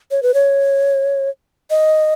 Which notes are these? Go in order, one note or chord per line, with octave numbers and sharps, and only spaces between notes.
C#5
B4
C#5
D#5